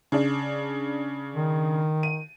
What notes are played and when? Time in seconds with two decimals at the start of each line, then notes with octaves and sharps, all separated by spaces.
0.12 C#3 D4
1.35 D#3
2.03 D#7